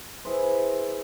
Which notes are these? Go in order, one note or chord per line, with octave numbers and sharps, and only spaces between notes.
E4 G#4 B4 C5